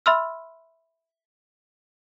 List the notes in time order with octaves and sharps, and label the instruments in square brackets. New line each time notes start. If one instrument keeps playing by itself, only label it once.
[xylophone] E5 B5 C6 E6 F6